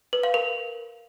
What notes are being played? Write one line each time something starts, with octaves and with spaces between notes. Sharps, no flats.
B4
F5
A#4